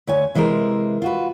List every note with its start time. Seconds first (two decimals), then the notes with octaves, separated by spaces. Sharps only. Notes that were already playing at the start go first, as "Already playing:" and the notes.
0.07 D2 C#5 G#5
0.35 C3 E3 G#3 F#4 A#4 C5
1.02 F4 F#4 B4